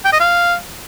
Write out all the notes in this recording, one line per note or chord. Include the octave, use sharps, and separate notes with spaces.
G5
D#5
F5